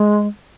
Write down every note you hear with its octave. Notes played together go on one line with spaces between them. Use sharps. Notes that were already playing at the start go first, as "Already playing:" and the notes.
Already playing: G#3